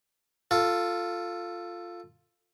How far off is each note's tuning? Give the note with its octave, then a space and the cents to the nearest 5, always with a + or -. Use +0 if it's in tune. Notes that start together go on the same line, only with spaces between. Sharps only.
F4 +0 A4 +10